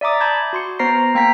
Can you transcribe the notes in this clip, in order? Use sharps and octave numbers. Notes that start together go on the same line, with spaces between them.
D5 E5 A#5 D6 D#6
A5 B5 G6 G#6
F#4 C6 C#7
B3 C5 A#5 A#6 C7
A#3 G5 A#5 B6